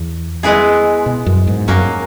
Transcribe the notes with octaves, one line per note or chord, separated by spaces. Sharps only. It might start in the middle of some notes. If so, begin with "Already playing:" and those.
Already playing: E2
G#3 B3 E4 G#4
B2
F#2
G#2
F#2 F#3 A#3 C#4